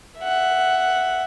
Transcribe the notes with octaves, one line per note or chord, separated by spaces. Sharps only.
E5 F#5